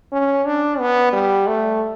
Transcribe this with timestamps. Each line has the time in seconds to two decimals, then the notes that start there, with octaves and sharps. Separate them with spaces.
0.12 C#4
0.45 D4
0.79 B3
1.13 G3
1.47 A3